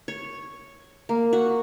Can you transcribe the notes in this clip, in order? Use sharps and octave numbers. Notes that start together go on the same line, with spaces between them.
C#5
A#3
F#4